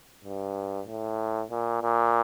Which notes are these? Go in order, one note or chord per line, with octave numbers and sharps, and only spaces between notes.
G2
A2
A#2
A#2